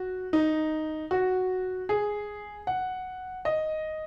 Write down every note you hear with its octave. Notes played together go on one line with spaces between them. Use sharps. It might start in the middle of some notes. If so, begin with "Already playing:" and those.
Already playing: F#4
D#4
F#4
G#4
F#5
D#5